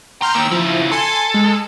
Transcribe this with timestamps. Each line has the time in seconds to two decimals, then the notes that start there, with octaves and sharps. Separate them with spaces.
0.22 A2 A#5 C6 F6 G6
0.35 D#3 A#3 E6
0.51 C#3 F3 E4
0.91 A4 G#5 C6
1.34 G#3